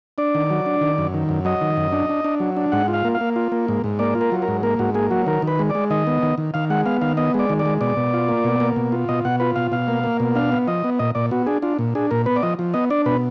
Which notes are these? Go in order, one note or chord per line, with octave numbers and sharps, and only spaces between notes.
D4 D5
D#3
F#3
D4
D#3
F#2
D#3
F#2
F#3 D#5
D#3
F#2
D4
D4
D4
F#3
D4
G#2 F#5
F4
F5
A#3
F5
A#3
F4
A#3
G#2
G#2
A#3 D5
F4
A#4
F#3
A#4
G#2
A#3 A#4
G#2 F#4
A#3 G#4
F#3 F#4
D#3 A#4
D#3
B4
G#3
D5
G#3
D#3 D#5
B3
D#3
D#3
D#3 F5
G#3 F#5
B3 F5
D#3 F5
B3 D#5
G#3 D5
D#3
D5
G#3
B2 D5
B2
F4
A#3
B2
A#3
B2
F4
B2 D#5
B2 F#5
F4 B4
B2 F5
B2 F5
A#3
A#3
B2
D4 F5
B3
F3 D#5
B3
A#2 D#5
A#2 D5
B3 F#4
D4 G#4
D4 F4
A#2
D4 G#4
A#2 A#4
B3 B4
D5
F3 D#5
F3
B3 D#5
D4 D5
B2 B4